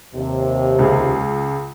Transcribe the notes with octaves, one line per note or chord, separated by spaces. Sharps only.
D#2 C3
C#2 G#4